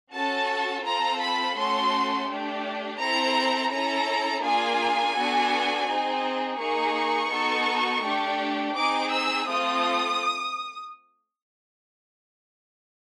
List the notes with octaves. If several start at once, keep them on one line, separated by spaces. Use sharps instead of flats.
C#4 F#4 A4 A5
C4 F4 A4 A#5
B5
A3 C#4 F#4 A4 C6
A3 D4 G4
C4 E4 A4 A#5
C#4 E4 A4 A#5
A#3 D4 F4 G#4 G#5
B3 D4 F#4 A4
C4 D#4 G#4
A#3 D#4 G#4 C#6
B3 D#4 F#4 A4
A3 D4 G4
C4 D#4 G#4 D6
E6
A3 C4 F4 A4 D#6